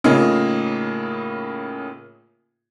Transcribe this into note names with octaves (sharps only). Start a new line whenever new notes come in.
A2 C#3 A#3 D#4 F4 G#4